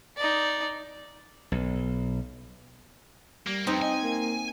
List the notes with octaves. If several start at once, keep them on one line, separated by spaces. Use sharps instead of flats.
D#4 D5
B1
G3 A#3
F2 C4 D#4
D#5 G#5
A#3